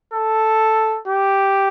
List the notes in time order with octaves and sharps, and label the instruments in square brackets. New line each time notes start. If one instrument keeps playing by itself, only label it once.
[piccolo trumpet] A4
G4